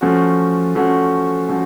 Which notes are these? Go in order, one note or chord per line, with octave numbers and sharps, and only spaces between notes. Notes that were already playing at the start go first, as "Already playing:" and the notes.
F3 A3 C#4 F#4
F3 A3 C#4 F#4
F3 A3 C#4 F#4